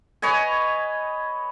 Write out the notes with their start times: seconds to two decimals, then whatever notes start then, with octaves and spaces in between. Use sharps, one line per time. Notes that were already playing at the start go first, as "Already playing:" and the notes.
0.22 B4 C#5 D#5 G#5